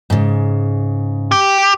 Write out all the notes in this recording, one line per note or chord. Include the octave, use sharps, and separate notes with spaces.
G#2 C#3
G4